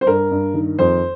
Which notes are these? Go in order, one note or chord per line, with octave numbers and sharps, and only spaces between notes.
C5
G2 A#4
G2
D#3
F2 C5